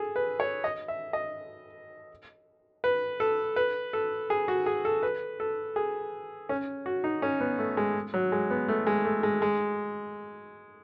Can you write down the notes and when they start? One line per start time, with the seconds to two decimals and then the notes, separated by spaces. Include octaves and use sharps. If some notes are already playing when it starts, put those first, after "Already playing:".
Already playing: G#4 A4
0.16 B4
0.40 C#5
0.64 D#5
0.88 E5
1.13 D#5
2.84 B4
3.20 A4
3.56 B4
3.93 A4
4.30 G#4
4.48 F#4
4.66 G#4
4.85 A4
5.03 B4
5.40 A4
5.76 G#4
6.49 C#4
6.86 F#4
7.04 D#4
7.22 C#4
7.40 B3
7.59 A3
7.77 G#3
8.14 F#3
8.32 G#3
8.51 B3
8.68 A3
8.87 G#3
9.05 A3
9.23 G#3
9.42 G#3